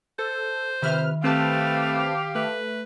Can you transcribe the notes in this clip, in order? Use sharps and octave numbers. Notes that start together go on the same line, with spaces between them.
A4 C5
C3 D#3 B4 E5 F6
A3 C4 G4 B4 F5 A5
A3 B4